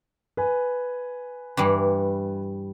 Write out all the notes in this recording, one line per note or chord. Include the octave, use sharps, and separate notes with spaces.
B4 G#5
G2 E3 G3